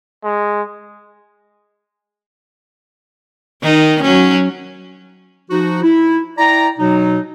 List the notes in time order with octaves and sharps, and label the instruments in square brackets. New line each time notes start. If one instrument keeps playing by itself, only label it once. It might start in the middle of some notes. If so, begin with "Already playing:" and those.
[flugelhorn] G#3
[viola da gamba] D#3 D#4
F#3 C#4
[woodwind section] F3 D#4 F#4
E4
E4 D5 G5 A#5
B2 F#3 D#4